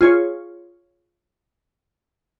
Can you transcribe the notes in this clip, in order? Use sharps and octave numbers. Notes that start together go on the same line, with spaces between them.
F4 G#4 C#5